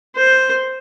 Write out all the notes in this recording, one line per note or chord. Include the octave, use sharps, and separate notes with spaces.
C5